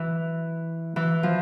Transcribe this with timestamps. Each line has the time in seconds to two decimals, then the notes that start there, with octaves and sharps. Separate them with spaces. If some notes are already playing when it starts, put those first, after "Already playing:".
Already playing: E3
0.96 E3
1.23 F3